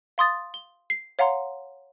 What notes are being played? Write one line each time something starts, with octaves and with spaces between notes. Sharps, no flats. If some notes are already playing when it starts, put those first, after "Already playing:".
F5 C6 D#6 A6
G7
C7
C#5 F5 F#5 A#5 C6